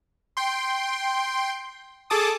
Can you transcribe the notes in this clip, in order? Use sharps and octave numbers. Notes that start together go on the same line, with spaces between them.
G5 C6
G#4 A4 A5 D6 D#6